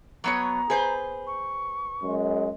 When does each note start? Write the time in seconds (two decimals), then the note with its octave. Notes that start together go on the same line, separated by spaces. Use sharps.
0.24 F#3 B3 C#5 A#5
0.70 G#4 B4 C5
1.27 C#6
2.03 F#2 G#3